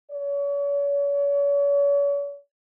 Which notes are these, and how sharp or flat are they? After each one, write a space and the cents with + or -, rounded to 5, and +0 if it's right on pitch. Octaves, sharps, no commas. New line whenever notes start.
C#5 +40